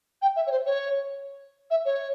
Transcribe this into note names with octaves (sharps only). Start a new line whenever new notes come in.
G5
E5
C#5
C5
C#5
E5
C#5